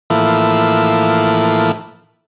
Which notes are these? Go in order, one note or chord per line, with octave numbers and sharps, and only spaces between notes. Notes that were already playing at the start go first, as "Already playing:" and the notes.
A2 E3 F3 A#3 E4 A4